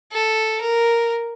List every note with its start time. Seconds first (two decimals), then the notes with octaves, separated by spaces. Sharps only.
0.13 A4
0.61 A#4